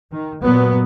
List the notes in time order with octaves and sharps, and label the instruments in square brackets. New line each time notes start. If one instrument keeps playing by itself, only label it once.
[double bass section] D#3
A#2 F#3 B3